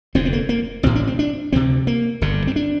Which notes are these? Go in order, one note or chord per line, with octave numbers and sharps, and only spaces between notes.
F1 F2 D3 C4
C4
A#3
A#3
A1 A2 C4
D4
C4
D4
D2 C3 C4
A#3
G1 G2 D3
C4
D4